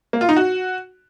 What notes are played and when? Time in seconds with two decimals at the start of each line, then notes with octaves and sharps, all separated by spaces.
0.13 A#3
0.21 F4
0.29 D#4
0.36 F#4